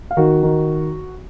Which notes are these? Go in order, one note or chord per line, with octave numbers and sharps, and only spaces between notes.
F5
D#3 F#4 F#5
D#3